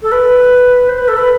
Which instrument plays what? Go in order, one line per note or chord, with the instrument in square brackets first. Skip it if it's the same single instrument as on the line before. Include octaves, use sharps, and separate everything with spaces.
[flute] A4
B4
C5
B4
A4
B4